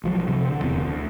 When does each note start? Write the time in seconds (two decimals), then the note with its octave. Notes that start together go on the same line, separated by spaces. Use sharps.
0.04 B1 F3 F#3
0.28 C3 F3
0.48 D3
0.61 E1 E2 C4
0.85 D2